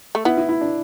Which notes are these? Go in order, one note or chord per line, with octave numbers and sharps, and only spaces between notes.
A3
B3 E4
E4
E4
D4